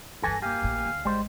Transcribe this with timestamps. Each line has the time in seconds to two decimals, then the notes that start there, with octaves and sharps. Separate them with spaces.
0.23 F1 G2 E3 A4 G#5 A#6
0.42 A#3 G4 F5 G#5
0.62 A1 A2
0.86 D2
1.05 G#1 G3 G#3 C5